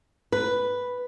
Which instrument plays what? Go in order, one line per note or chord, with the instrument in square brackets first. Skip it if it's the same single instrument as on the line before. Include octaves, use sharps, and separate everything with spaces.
[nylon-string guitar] B4